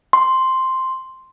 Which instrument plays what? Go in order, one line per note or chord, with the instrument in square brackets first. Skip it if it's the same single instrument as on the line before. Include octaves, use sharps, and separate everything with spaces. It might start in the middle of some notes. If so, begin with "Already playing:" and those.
[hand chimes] C6